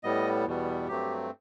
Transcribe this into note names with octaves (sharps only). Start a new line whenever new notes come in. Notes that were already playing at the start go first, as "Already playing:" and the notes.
A2 G3 B3 D#5
E2 B2 G3 B3
G2 F#3 A3 C4 G4